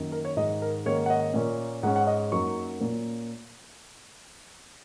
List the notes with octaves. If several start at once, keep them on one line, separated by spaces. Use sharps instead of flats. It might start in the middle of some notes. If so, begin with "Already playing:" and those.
Already playing: F#2 D#3 A#3 D#4
A#4
C#5
G#2 D#3 G#3 D#4 D#5
A#4
G#2 D#3 A#3 C#4 C#5
F#5
D#5
A#2 A#3 C#4
G#2 G#3 C#4 F#5
F#5
D#5
F#2 F#3 A#3 D#4 C#6
A#2 A#3 C#4